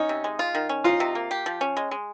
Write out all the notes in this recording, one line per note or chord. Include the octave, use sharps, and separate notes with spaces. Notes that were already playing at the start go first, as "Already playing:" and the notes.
Already playing: C#4 D#4
C3
G#3
F4
D#3
C#4
D#4 F4
C3
A#3
G4
F3
C#4
G#3
G#3